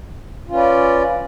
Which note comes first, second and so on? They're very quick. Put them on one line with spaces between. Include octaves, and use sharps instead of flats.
F4 C#4 B4 D5